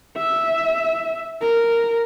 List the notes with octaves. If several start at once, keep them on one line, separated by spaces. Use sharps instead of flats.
E5
A#4